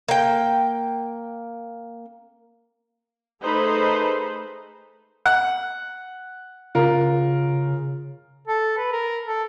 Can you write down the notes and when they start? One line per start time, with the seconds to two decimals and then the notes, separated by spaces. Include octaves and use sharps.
0.09 A#3 G5
3.42 A3 D#4 G#4 A4 B4 C5
5.26 F#5
6.75 C#3 F4 A#4
8.48 A4
8.77 B4
8.92 A#4
9.26 A4